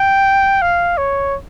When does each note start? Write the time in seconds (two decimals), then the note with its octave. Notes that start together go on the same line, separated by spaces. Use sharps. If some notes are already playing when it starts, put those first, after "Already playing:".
Already playing: G5
0.62 F5
0.98 C#5